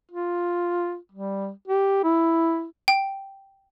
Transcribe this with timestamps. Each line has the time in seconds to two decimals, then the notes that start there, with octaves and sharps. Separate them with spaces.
0.11 F4
1.12 G3
1.68 G4
2.03 E4
2.88 G5